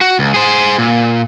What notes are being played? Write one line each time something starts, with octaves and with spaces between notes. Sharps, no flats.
F#4
C#2
G#4 C5
A#2